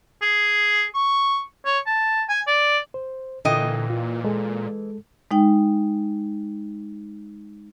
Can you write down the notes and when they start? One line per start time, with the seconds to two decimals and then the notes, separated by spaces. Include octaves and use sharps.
0.22 G#4
0.94 C#6
1.65 C#5
1.86 A5
2.29 G#5
2.47 D5
2.94 C5
3.45 A#2 D3 E3 A4 D#5 G5
3.90 F4
4.25 G#3 A4
5.31 G#3 D#4 G5